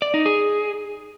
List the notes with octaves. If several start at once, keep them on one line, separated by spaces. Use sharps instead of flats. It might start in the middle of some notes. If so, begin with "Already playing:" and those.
D5
D#4
G#4